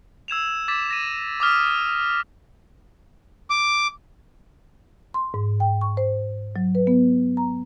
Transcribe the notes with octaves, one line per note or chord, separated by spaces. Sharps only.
E6 G#6 E7 F7
D6 G#6 A6 B6 E7
A#6 D#7
D6 D#6 F6 B6
D6
C6
G#2
G5
C#6
C5
F#3
B4
B3
A#5